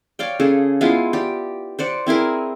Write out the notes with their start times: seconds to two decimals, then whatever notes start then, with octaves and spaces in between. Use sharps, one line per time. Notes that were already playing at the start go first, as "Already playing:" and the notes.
0.19 C#5 D5 F5 G5
0.40 C#3 G#4 A4
0.81 G#3 B3 E4 F4
1.13 G4 D5
1.79 C5 D5 F#5
2.06 C4 E4 G#4 A#4